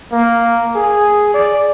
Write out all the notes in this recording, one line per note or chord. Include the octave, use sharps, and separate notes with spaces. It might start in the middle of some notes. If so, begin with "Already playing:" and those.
A#3
G#4
D5